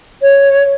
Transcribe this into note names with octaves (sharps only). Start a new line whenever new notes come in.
C#5